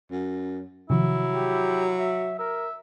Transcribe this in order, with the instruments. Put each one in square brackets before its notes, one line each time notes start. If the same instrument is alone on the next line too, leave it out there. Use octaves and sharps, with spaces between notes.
[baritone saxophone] F#2
[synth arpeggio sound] C3 D#3 F3 [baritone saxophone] F#3 [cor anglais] E4
[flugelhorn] G4
E5
[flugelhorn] A#4 [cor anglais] E5